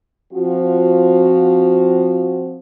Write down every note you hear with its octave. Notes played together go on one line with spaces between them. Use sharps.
F3 C4 F4 F#4